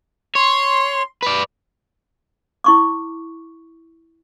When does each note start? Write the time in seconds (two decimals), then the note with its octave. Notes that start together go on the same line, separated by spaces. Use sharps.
0.35 C#5 C6
1.23 B4 D5
2.64 E4 C#6 D6